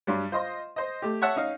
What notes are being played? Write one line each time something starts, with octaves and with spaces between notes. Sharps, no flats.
G2 F#3 G3
F4 C5 D#5 C6
C5 D#5
A3 G4
C#5 E5 F#5 A5
C#4 D#4 F5